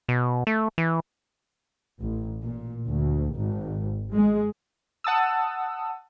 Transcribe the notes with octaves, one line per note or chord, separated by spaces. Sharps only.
B2
A3
E3
A1
A#2
D2
G#1
G#3
F#5 A5 D#6 E6